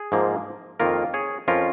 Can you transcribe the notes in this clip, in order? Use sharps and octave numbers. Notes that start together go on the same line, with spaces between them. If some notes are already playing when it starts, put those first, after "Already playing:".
Already playing: G#4
G#2 F3 A#3
F2 D#3 A#3 F4 A#4
G#4 C#5
F2 F3 C#4 F4 A#4